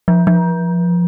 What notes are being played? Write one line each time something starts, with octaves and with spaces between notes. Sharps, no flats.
F3
F3